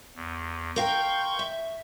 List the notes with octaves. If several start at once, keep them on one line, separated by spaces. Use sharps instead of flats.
E2
A#4 F5 G5 C6 C#6 G6
E5